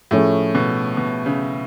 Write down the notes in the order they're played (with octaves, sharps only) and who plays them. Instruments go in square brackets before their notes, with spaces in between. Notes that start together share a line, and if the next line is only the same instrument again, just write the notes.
[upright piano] A2 [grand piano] F3 A3 C#4 G#4
[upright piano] B2
B2
C#3